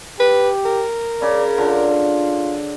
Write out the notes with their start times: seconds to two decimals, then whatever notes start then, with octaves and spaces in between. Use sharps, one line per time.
0.20 G4 B4
0.65 A#4
1.22 C#3 D5
1.58 D3 F4